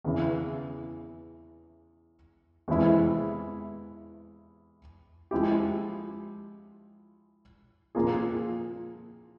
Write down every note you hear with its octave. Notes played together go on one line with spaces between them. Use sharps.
E2 C#3 E3
E2 C3 E3 G#3 E4
F3 G#3 E4 G4
A#2 F3 A#3 F4 G#4